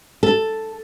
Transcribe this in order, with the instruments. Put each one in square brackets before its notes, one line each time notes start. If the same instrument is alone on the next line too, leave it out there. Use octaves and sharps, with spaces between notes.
[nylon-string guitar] A4